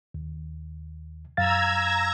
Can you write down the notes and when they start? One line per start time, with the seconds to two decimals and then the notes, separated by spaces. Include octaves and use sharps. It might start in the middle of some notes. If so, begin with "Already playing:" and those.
0.14 D#2
1.37 F#2 F5 A#5 E6 G#6 A6